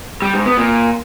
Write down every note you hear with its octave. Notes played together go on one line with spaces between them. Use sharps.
G3
G#2
B3
A#2